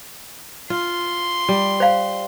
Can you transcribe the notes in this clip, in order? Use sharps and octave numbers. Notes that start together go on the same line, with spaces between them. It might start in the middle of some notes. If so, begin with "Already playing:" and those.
F4 C6
G3
C5 F5